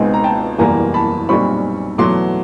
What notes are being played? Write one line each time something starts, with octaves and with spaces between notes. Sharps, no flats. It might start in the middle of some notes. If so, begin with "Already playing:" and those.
Already playing: C#2 B2 G#3 C4 D#4 G#5
A#5
G5 A5
F#1 E2 B2 G3 A#3 G#5 A#5
A5 B5
B1 A#2 G3 C4 B5 C#6
E2 B2 F#3 A3 C6 D6